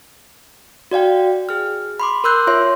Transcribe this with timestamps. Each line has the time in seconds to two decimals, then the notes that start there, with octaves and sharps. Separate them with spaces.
0.91 F#4 D5 F5 G5
1.49 G#4 F6
2.00 B5 C6 D6
2.24 A#4 C6 E6 F#6 G6
2.47 F4 C#5 E5 C6